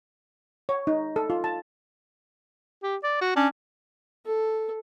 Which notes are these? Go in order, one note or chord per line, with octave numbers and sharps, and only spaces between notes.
C#5
D#4
A4
F4
A5
G4
D5
F#4
C#4 D4
A4